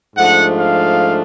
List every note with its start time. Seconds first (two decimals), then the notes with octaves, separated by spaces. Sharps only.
0.16 G#2 F3 A3 D4 F#5
0.59 F5